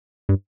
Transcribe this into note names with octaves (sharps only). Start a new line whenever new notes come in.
G2